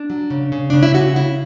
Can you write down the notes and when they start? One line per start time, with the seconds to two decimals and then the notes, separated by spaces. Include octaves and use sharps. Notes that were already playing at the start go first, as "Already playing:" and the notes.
Already playing: D4
0.10 F#3
0.30 C#3
0.52 C#3
0.70 C#3 D4
0.83 E4
0.94 C#3 F#4
1.16 C#3 E4